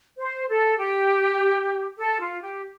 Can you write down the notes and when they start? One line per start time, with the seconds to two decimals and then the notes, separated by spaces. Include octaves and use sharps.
0.18 C5
0.49 A4
0.78 G4
1.98 A4
2.20 F4
2.42 G4